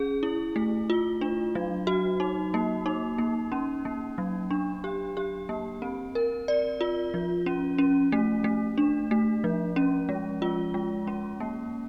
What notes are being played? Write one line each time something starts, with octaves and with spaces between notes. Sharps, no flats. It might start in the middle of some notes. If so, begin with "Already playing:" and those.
Already playing: C#4 G#4
E4
A3
F4
D4
F#3
F#4
D#4
A#3
D#4
A#3
C#4
A#3
F#3
D4
G4
G4
A#3
C4
A#4
D5
F4
F3
C#4
C#4
A3
A3
D4
A3
F3
C#4
G#3
F4
G#3
C#4
A#3